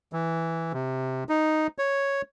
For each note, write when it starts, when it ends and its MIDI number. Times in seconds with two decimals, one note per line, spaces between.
0.13 0.72 52
0.73 1.24 48
1.29 1.67 63
1.78 2.22 73